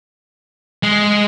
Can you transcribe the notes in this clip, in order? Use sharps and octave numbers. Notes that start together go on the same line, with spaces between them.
G#3